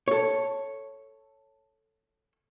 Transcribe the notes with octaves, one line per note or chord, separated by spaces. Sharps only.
A4 C#5